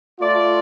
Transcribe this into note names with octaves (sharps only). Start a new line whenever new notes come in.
A3 F4 D5